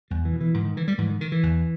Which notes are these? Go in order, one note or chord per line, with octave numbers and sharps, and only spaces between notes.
E2 G3
E3
B2
E3
G#2 D#3
D#3
E3
G3
G#2 E3
D#3
D#3
E3
E2